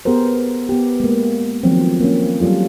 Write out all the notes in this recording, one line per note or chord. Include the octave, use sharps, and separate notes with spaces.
B3 G4 G#4 A#4 C5
B3 G4
G#3 A#3
D#3 F3 F#3 A3 C4
A#3 C#4
F#3 G3 F4 A4